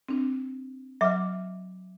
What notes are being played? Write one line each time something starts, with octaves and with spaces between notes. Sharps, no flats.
C4 D4
F#3 D#5 E5 D6 F6